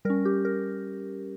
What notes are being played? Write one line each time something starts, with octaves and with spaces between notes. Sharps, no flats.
G3 C#4 A#4
G4
A#4